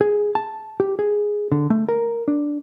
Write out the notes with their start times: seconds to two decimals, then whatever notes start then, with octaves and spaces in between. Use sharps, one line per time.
0.01 G#4
0.35 A5
0.80 G4
0.99 G#4
1.52 D3
1.70 A3
1.89 A#4
2.28 D4